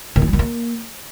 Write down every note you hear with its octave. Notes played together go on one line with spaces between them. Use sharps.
D#3
D#4
G3
D#3
A#3